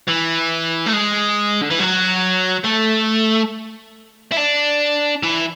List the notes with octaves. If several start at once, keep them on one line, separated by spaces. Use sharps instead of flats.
E3
A3
G#3
D3
E3
F#3
A3
E4
D4
E3